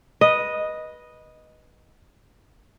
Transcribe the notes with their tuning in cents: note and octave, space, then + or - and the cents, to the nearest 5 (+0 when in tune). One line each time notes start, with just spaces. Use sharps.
B4 -15 D#5 +0